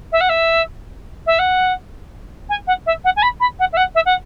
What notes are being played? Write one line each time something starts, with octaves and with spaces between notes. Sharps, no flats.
E5
F#5
E5
E5
F#5
G#5
F#5
E5
F#5
G#5
B5
B5
F#5
E5
F#5
E5
F#5